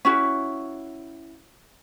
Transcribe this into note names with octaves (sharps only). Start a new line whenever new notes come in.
C#4 E4 F#4